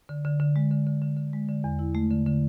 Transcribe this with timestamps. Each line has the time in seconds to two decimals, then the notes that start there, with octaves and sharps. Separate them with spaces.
0.09 D3
0.25 D3
0.40 D3
0.56 G#3
0.71 D3
0.87 D3
1.02 D3
1.17 D3
1.33 G#3
1.49 D3
1.64 E2
1.79 E4
1.95 A3
2.11 D3
2.26 D3